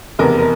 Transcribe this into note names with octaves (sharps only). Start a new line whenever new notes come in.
F1 E2 C3 A#4
A#4